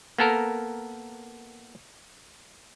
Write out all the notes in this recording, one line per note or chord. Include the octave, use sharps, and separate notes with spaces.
A#3 B3 A4 A#4